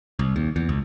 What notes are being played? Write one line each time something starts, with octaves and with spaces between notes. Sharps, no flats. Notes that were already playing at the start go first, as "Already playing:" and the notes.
C2
D#2
E2
C#2